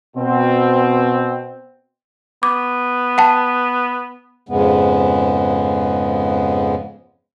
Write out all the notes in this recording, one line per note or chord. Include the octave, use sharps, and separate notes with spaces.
B2 C4
B3 D6
F#5 G5 A5
F2 G#2 C#3 G#3 B3